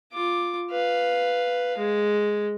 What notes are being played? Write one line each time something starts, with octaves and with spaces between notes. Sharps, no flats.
F4 D6
B4 F5
G#3